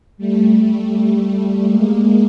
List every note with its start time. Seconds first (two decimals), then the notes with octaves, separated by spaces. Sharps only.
0.18 G3 A3
1.67 G#3 A#3